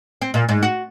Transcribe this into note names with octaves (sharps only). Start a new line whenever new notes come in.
C4
A#2
G#2
F#4